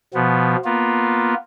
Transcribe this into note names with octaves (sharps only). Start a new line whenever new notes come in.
B2 F3 B3
A#3 B3 F4